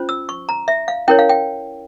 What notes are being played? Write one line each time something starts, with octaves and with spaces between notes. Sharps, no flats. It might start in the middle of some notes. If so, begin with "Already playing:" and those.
Already playing: C#4 F4 C5
E6
C#6
A#5
E5
F5
C#4 E4 A#4 C#5 G5
F5
G5